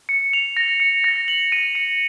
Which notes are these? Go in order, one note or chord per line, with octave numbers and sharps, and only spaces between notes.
C#7
F7
A#6
C#7
A#6
F#7
D#7
C#7